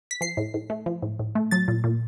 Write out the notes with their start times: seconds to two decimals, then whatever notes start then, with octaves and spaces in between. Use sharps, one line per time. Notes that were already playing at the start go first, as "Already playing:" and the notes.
0.11 B6
0.21 F3 C7
0.37 A2
0.54 A2
0.70 A3
0.86 F3
1.02 A2
1.19 A2
1.35 A3
1.51 F#3 A6
1.68 A#2
1.84 A#2